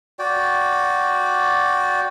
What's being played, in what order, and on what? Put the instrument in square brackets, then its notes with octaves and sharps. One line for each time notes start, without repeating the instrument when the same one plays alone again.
[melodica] F#4 D5 G5